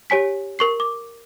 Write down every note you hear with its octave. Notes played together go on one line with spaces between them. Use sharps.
G4 C#5 G#5 B6
A#4 C#6 C7
D6